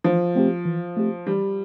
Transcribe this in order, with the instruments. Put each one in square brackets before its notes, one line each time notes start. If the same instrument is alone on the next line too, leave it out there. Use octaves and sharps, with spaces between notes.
[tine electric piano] E3 [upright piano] F3
[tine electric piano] A3 C4 G4
E3
A3 C4 G4
[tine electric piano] E3 [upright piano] G3